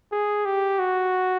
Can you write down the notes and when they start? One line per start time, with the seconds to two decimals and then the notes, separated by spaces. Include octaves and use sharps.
0.12 G#4
0.45 G4
0.79 F#4